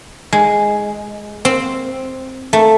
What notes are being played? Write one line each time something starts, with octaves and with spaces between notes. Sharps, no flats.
G#3
C4
A3